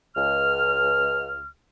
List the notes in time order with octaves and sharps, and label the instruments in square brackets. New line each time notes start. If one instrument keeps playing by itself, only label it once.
[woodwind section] C#2 F6